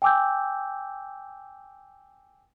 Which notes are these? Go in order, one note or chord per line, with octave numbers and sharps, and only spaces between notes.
G5 G#5 D6 E6 G6